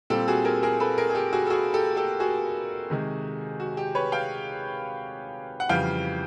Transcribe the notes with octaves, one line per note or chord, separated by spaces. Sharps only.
A#2 G3 C4 G4 A4
F#4 G#4
G#4 A#4
G#4 A#4
A4 B4
G#4 A#4
G#4
G4 A4
F#4 G#4
A4
F#4 G#4
G4 A4
G4 A4
F#4 G#4
C3 D#3 G#3
F#4
G4
B4 C#5
F5 G5
F#5
F2 C#3 E3 G3 F5 G5